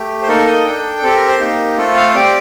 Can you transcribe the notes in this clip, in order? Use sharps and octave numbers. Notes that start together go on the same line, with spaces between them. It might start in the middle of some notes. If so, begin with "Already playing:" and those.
Already playing: A3 G4
C5
A#3 D#4 A4 A#4
D#5
D4 A4 G5
C4 G4 A4
A#4
C5
A#3 D#4 G4
A3 C4 F4 A4
F5
C5
C4 G4 D5